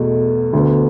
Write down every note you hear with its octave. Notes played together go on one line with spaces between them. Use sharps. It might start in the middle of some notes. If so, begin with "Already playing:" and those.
Already playing: E2 B2 A3
D2 D3 B3